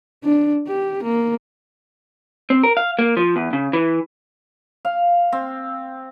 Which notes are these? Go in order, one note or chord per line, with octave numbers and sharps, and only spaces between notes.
D4
G4
A#3
C4
A#4
F5
A#3
F3
E2
C#3
E3
F5
C4